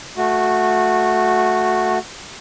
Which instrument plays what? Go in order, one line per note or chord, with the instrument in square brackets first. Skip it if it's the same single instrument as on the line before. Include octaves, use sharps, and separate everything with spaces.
[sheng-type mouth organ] A3 F#4